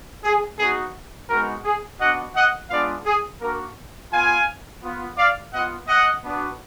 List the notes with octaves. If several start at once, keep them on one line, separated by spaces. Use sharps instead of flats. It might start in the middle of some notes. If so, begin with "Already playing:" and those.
G#4
B3 D#4 F#4 G#4
G#3 B3 D#4 F#4 A#4
G#4
B3 D4 F#4 D#5 F#5
D#5 F#5
G#3 B3 D4 F4 D5 F5
G#4
A#3 D4 F#4 A#4
B3 F4 F5 G#5
B3 F4
D5 F5
B3 F4 D#5 F#5
D#5 F#5
B3 D4 F#4